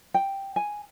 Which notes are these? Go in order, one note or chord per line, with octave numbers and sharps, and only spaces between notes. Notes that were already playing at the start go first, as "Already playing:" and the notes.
G5
G#5